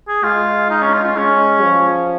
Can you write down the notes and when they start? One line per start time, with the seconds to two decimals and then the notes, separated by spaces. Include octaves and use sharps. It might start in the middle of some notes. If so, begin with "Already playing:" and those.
0.08 G#4
0.23 G#3 F4
0.70 D#4
0.82 C#4
0.93 F4
1.04 F4
1.16 G#3 C#4
1.62 F3